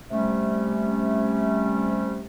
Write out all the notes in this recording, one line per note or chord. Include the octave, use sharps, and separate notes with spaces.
C3 G3 A3 C#4